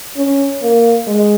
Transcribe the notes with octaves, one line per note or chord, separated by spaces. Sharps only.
C#4
A#3
G#3